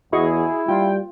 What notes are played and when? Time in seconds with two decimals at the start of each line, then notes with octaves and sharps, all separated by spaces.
0.13 E2 E4 F#4 G#4 D#5 C#6
0.68 G3 F4 G5